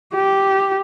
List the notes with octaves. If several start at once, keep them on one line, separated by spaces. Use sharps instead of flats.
G4